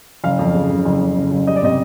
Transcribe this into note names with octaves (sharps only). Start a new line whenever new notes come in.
F#1 F5
F2
C#3
F#1
F#1
F2
C#3
F#1
G3 D#5
D5
C3 D#5